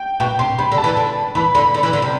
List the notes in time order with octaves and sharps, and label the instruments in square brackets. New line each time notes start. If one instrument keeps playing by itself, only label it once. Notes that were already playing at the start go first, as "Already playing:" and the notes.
Already playing: [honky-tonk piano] G5
[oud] B2 [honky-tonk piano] G5
[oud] C3 [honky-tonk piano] C6
[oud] C3 [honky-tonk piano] B5
[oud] D3
[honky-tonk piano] A5
[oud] E3
D3
[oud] E3 [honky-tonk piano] B5
[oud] D3 [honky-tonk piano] B5
[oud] D3
E3
D3
C3